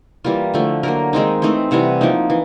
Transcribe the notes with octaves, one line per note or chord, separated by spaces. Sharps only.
E3 G3 A#3 F4
D3 F3 A3
D3 F#3 A#3 A#4
D#3 G#3 C4 D#4
E3 A3 C4 D#4 C5
C3 E3 G3 F#5
F3 A#3 D#4
E3